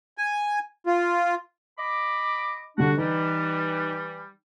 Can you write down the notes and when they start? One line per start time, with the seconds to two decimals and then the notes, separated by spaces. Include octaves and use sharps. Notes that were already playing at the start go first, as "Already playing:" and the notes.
0.18 G#5
0.86 F4
1.79 D#5 B5 D6
2.78 D3 G3 D4 F#4
2.97 E3 G3 D#4